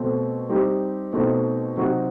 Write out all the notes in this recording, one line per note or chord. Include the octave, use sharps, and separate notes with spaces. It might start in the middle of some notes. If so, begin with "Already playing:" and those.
Already playing: B2 A3 C4
G3 C4 D#4 G4
B2 A3 C4 D#4
C3 F#3 C4 D#4 F#4